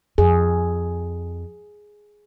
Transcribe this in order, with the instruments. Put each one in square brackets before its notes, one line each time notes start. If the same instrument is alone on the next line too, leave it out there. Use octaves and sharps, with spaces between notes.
[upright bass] F2 [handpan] G#4